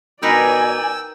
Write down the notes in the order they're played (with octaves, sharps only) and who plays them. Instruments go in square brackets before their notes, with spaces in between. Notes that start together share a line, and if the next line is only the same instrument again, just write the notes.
[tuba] B2 [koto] D#4 A#4 B4 [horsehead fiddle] D5 G#5 [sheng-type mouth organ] G5 E6